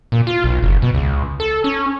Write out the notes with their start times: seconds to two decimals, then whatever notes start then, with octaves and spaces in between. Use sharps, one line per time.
0.12 A#2
0.27 F4
0.44 B1
0.62 F#1
0.82 B2
0.94 C#2
1.40 A4
1.64 C#4